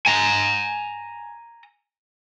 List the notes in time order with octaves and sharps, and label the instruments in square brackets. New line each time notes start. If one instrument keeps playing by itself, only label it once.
[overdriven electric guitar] G#5 A#5